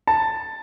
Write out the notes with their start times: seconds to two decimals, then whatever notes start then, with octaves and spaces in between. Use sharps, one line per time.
0.07 A5